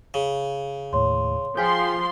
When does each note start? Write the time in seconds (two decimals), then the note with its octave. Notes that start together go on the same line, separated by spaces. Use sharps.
0.14 C#3
0.93 D#2 A2 C#5 C6
1.57 F3 G#4 F5 G5 G#5 C6 G6 B6